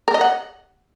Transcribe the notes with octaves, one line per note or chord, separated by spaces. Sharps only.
A#4
D#5
F#5